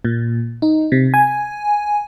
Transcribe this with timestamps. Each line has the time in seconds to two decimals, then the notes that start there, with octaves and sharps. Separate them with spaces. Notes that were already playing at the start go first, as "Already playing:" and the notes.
0.05 A#2
0.62 D#4
0.92 C3
1.14 G#5